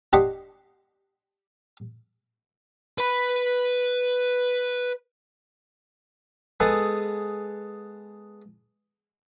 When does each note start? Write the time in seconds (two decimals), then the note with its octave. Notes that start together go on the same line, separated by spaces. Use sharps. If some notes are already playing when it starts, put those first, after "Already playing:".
0.13 D4 G4 D#5 F#5 B5 C6
2.98 B4 B5
6.60 G#3 B3 G#4 A4 B4